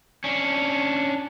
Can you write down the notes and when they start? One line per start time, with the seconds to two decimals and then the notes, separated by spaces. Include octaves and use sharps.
0.24 C#4 D4